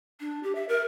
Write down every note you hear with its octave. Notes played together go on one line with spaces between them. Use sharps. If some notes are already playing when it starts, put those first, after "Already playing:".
D4
G4
E5
A#4